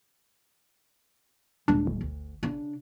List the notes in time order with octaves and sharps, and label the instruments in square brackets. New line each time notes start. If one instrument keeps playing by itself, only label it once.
[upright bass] D#1 G#3 [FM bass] D4
[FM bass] G1
[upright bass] D2
C#3 D4